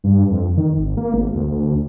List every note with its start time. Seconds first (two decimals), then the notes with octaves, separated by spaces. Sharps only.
0.04 G2
0.31 F2
0.57 D#3
0.77 G#1
0.97 A#3
1.14 G#1
1.35 D2